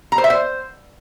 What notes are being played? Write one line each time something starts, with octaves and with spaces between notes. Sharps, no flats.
A#5
C5
E5
C5